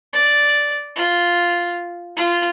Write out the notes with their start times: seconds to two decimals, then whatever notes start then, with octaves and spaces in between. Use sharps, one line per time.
0.13 D5
0.96 F4
2.17 F4